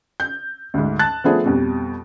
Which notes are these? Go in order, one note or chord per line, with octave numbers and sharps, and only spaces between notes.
G6
D2 G#2
A5 F#6 A6
F3 A3 B3 D4 G#4 C5
F2 B2 G3